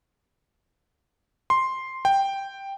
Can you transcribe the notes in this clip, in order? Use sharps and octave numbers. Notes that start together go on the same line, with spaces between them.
C6
G5